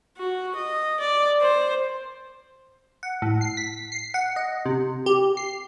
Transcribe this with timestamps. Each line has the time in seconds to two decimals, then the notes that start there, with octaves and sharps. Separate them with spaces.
0.17 F#4
0.56 D#5
1.00 D5
1.41 C5
3.03 F#5
3.22 A2
3.41 C7
3.57 B6
3.92 C7
4.14 F#5
4.36 D#5
4.66 C3
5.06 G4
5.37 C7